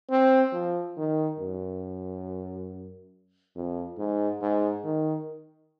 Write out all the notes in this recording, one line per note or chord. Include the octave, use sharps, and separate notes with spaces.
C4
F3
D#3
F#2
F2
G#2
G#2
D#3